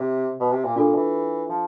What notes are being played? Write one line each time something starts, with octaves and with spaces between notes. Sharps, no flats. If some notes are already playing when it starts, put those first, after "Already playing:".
Already playing: C3
B2
C3
A#2
A#2 D4 F4 A4
E3
F3